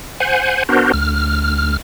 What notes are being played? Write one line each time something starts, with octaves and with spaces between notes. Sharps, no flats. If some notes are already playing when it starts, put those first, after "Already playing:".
C5 F#5 G#5
B3 D4 F#4 A#4 C5
D2 F6